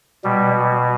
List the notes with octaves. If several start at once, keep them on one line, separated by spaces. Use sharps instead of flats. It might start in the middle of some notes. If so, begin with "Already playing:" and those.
B2 G3